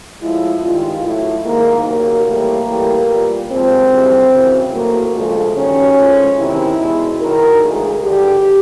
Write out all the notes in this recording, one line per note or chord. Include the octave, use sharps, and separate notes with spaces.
A2 F3 G#3 E4
G2 D#3 G#3 F4
A2 F#3 E4
G#2 D#3 G#3 A#3
D#2 C#3 F#3 A#3
A2 E3 G3 A#3
A2 E3 G3
A#2 G3
D#2 C#3 F3 G#3 C4
D2 C#3 E3 G3
F#2 C#3 E3
A2 F#3 A#3
D2 C#3 F3 G#3 A3
G2 D#3 F#3 C#4
A2 F3 G#3
E2 C3 D#3 E4
E2 B2 G#3
F#2 D#3 F#3 A#4
D2 C#3 E3 G#3 G#4
G2 D3 G3 G4